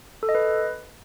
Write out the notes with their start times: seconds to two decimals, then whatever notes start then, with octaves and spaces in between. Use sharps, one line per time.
0.23 A4
0.29 D#5
0.35 B4